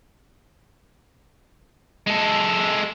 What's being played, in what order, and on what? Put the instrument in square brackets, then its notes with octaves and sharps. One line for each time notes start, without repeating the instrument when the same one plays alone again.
[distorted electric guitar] G#3 A4